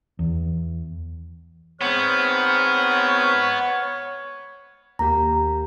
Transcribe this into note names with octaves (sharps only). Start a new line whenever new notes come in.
E2
G#2 B3 C4 C#5 F6 G6
D#2 A#3 G4 A#5